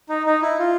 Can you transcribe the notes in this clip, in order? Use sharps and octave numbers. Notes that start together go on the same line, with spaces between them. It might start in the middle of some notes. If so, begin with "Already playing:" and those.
D#4
D#4
E4
F4